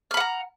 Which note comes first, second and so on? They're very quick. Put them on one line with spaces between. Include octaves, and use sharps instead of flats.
F6 B5 F#5 A#5